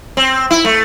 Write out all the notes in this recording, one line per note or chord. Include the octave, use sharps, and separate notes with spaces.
C4
E4
A3